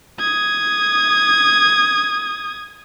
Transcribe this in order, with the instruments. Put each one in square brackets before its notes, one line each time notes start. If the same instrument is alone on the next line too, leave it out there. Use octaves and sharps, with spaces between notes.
[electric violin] D#6 G#6